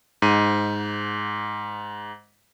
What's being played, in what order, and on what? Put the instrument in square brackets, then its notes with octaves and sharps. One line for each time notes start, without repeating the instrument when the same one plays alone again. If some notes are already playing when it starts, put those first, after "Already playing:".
[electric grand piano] G#2 D#7